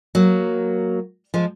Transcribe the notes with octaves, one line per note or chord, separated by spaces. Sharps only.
F#3 A#3
F3 G#3